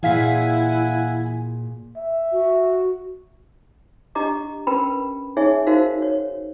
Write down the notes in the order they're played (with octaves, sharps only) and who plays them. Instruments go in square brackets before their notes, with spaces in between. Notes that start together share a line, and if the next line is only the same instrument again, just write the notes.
[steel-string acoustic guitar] A#2 G#4 [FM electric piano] E3 F5 B6 [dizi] E4 [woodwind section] F#5 G#5
[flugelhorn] E5
[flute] F#4
[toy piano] D4 G4 D#5 A#5 D6
C#4 A#4 B4 G5 B5
D#4 G#4 C#5 E5 G#5
D#4 F#4 A#4 C5 F5
C#5